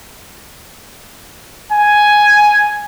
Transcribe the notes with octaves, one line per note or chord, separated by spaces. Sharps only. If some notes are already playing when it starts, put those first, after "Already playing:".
G#5